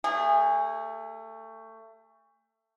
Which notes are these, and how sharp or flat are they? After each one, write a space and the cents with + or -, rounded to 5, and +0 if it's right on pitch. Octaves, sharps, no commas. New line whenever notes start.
A3 +25 G#4 -30